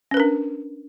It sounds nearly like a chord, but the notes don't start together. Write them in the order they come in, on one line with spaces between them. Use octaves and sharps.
C#4 B4 A#4 D4